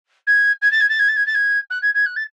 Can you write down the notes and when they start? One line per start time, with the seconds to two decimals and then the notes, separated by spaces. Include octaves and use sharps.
0.26 G#6
0.61 G#6
0.71 A6
0.80 G#6
0.89 A6
0.99 G#6
1.08 A6
1.16 G#6
1.26 A6
1.34 G#6
1.70 F#6
1.82 G#6
1.94 G#6
2.05 F#6
2.16 A6